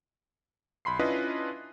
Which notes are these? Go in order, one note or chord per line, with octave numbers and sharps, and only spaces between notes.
B1 B5 C6 C7
C#4 D4 E4 F4 B4 D#5